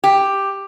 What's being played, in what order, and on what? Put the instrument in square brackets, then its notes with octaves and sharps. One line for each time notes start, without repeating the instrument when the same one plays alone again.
[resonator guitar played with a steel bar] G4